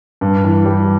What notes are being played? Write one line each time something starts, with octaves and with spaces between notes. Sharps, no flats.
G2
E3
G3